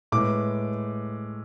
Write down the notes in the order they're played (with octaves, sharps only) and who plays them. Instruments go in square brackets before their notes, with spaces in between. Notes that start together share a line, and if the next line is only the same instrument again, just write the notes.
[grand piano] A2 G#3 B3 D6